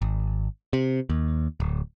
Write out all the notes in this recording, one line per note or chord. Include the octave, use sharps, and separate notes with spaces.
G#1
C3
D#2
D1